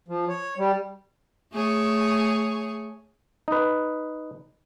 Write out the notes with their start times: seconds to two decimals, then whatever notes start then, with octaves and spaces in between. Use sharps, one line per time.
0.08 F3
0.28 C#5
0.58 G3
1.52 A3 G#4 C#5
3.48 D#4 B4